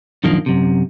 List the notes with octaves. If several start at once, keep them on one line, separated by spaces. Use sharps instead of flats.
F#2 A#2 D#3 F3 A#3 D4
F#2 C3